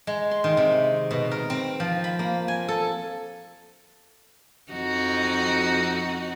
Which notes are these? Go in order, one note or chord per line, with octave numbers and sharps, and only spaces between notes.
G#3
C6
D#3
C3
B2
A#4
C4
F3
B5
A#3
G#5
A4
F2 D#4 F#4